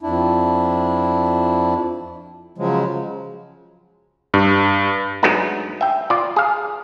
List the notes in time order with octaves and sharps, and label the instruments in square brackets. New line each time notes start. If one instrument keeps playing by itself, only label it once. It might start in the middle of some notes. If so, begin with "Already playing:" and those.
[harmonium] F2 D4 E4
C#3 F3 F#3 G#3
[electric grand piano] G2
[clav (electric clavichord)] F#3 G#3 A3 B3 D4 D#4
E5 G5
F4 D5
G#4 F5